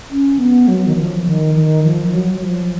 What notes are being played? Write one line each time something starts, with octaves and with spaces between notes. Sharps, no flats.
C#4
B3
F#3
D#3
F3
D#3
D#3
F3
F3
F#3
F#3
F3